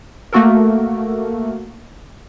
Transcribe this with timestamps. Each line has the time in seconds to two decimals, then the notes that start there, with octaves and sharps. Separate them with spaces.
0.33 A3 A#3 F#4 A4 A#4